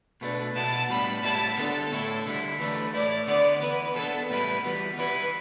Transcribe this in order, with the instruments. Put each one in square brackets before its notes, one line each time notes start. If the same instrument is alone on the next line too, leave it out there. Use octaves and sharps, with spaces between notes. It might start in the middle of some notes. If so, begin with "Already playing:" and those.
[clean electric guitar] B2 A3 D4 [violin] B4
[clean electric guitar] B2 B3 E4 [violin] A5
[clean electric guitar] A2 G3 B3 D4 [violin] B5
[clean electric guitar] A2 G3 B3 E4 [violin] A5
[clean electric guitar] D3 B3 D4 [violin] A4
[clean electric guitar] A2 A3 E4
D3 G3 E4
[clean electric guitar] E3 A3 D4 [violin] B4
[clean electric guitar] A2 A3 E4 [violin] D5
[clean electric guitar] D3 B3 E4 [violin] D5
[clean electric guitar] E3 B3 E4 [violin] B4
[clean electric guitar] E3 G3 B3 D4 [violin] A4
[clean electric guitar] A2 G3 E4 [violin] B4
[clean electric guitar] E3 G3 B3
[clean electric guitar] E3 G3 E4 [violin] B4